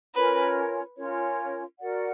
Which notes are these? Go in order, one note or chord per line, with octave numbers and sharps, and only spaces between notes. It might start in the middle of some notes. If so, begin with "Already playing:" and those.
C#4 F4 A#4 B4 C#5
C#4 F4 A#4 C#5
F#4 A#4 D5 F#5